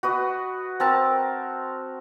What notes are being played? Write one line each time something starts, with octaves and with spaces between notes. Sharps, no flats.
F#4 B4 D#5
C4 A#4 A5